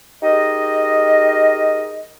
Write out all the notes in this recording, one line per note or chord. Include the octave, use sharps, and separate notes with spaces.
D#4 G4 G#4 A#4 D#5